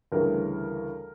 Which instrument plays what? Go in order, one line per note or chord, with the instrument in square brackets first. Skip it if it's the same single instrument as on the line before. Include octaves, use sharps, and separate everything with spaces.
[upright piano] D2 C#3 E3 G3 A#4